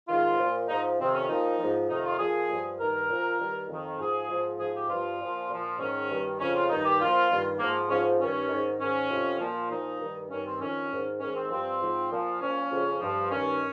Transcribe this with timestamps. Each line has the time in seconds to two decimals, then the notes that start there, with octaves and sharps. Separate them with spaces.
0.08 G#2 D#3 F4
0.39 A#2 F3
0.68 G#2 F3 D#4
0.98 F2 C3 D#3 C4
1.14 C#4
1.29 A#2 F3 D#4
1.58 G#2 F3
1.89 F2 C3 D#3 D#4
2.04 F4
2.18 A#2 F3 G#4
2.49 G2 F3
2.79 G2 D#3 A#4
3.09 A#2 F3
3.39 G2 D#3
3.68 F2 D#3
3.99 G#2 F3 G#4
4.29 G#2 F3
4.59 G#2 F3 G#4
4.74 G4
4.89 G2 F3 F4
5.20 A#2 F3
5.49 A#2 F3
5.79 G#2 D#3 C#4
6.09 G2 D#3
6.39 F2 C#3 F3 C#4
6.54 F4
6.69 G2 D#3 D#4
6.85 G4
7.00 A#2 F3 F4
7.30 G2 D#3
7.59 G#2 F3 A#3
7.90 G#2 F3 C#4
8.20 G2 D#3 C#4
8.49 G#2 D#3
8.80 G#2 D#3 C#4
9.10 F2 C3 F3
9.40 A#2 F3
9.71 A#2 F3 D#4
10.00 G2 D#3
10.30 G2 D#3 C#4
10.46 C4
10.60 F2 D#3 C#4
10.91 G#2 D#3
11.20 G#2 D#3 C#4
11.36 C4
11.50 G2 F3 C4
11.81 G#2 F3
12.11 A#2 F3
12.41 A#2 F3 C#4
12.71 F2 C#3 F3
13.01 G2 F3
13.31 G2 D#3 C#4